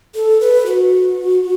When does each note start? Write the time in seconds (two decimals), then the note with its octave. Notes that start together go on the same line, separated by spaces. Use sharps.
0.15 A4
0.41 B4
0.66 F#4